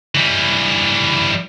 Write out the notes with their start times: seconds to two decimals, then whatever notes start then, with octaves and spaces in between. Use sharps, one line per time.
0.15 E3 G3